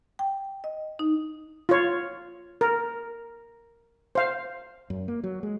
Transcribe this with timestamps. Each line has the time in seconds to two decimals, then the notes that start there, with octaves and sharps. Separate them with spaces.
0.19 G5
0.64 D#5
0.99 D#4
1.69 F4 C#5
2.61 A#4
4.15 C5 F5
4.90 F#2
5.08 A#3
5.23 F#3
5.43 G#3